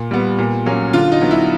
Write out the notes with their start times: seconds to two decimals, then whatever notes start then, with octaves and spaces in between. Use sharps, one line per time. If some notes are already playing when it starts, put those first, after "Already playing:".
Already playing: A#2
0.11 G3 B3
0.39 A#2
0.66 F#3 A#3 C#4
0.93 D3 F4
1.12 D#4
1.21 F#3 B3
1.31 E4